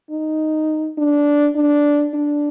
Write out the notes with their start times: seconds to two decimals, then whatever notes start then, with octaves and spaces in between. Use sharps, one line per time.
0.11 D#4
0.98 D4
1.56 D4
2.14 D4